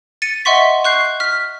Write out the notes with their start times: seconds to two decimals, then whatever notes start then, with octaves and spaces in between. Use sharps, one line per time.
0.22 A6 C#7 D#7
0.45 D#5 E5 F#5 C6 C#6 B6
0.84 C#6 F#6 G6 C7
1.20 F6 B6